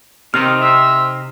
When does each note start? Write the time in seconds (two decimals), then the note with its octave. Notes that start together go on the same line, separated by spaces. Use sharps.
0.34 C3 D#3 C4 D#4 F6
0.61 C5 E5